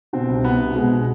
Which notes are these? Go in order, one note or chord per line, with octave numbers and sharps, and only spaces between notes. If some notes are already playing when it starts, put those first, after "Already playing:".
B2 C4
C2
C2 B3
B2
B2 G#3